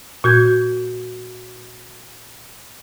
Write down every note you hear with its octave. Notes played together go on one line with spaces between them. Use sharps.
A#2 F#4 G6 G#6